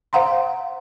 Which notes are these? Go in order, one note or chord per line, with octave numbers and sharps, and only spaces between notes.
C5 F5 F#5 A#5 C6